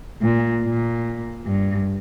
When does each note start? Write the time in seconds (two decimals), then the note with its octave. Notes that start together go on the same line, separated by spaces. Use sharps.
0.22 A#2
0.64 A#2
1.45 G2